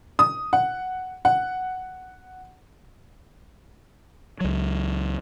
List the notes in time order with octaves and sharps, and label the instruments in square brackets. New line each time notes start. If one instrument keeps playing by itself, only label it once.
[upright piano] D#6
F#5
F#5
[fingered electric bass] C#2 F#3